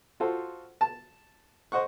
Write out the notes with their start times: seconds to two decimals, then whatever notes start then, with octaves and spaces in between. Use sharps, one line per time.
0.20 F4 F#4 A4 C5
0.81 A5
1.72 C5 D#5 F#5 C#6